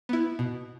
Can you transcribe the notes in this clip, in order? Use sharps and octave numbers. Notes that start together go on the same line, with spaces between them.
B3 E4
B2